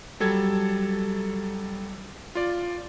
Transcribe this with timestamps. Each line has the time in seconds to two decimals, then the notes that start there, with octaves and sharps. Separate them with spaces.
0.20 F#3 G3 A4 G#6
2.35 F4 D5